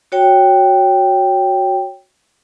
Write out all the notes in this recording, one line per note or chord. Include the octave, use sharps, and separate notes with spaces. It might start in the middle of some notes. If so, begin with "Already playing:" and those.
F#4 C#5 G5